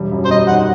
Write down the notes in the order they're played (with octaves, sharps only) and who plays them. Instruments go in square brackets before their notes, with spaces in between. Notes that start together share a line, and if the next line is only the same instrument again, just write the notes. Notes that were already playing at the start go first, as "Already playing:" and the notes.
Already playing: [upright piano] E1 G3
F#2
[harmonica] C5
[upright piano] G3 [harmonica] D#5
[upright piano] D#3 [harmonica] F#5